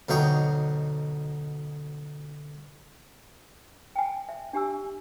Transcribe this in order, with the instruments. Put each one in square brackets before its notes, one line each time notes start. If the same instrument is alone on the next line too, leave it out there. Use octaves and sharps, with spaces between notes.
[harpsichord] D2 B2 F#3 D#4 G5 C#6
[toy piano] G5 G#5
E5
D4 G4 G#5 E6